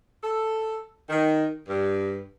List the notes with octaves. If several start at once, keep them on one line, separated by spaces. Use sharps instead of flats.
A4
D#3
G2